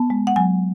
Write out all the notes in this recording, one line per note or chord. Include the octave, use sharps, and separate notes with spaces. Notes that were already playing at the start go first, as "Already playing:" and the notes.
Already playing: B3 A5
G#3
F#5
F#3 G#5